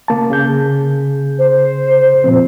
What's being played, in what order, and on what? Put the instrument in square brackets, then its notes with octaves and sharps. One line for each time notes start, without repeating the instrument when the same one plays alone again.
[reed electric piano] C#3 A#3 A5
C#3 G#4 G6
[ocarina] C5
[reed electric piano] A#2 F3 C4